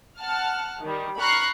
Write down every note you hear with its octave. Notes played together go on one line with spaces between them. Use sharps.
F#5 A5 F6
D#3 G3
A#5 B5 C#6 F6 F#6 C7